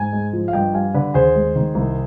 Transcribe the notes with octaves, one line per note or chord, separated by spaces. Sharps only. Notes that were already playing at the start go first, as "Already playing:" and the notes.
Already playing: G#2 G#5
G#3
F3
F5
G2 D#5 G5
G3 F5 G#5
D3 B4 D5
D#2 G#4 C5
G#3
D#3
C2